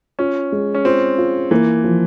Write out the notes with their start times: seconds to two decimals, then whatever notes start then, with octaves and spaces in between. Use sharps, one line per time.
0.19 C#4 F4
0.52 G#3
0.75 C#4
0.85 C4 F4
1.18 F4
1.51 E3 A#3
1.84 F3